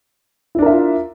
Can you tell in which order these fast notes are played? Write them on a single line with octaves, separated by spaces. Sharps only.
E4 D4 A#4 E5 F4